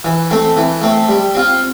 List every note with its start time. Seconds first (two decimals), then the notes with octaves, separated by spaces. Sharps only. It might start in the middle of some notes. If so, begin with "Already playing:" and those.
0.04 E3
0.31 A3 C4
0.57 E3
0.82 A3 C4
1.09 G3
1.34 C4 F4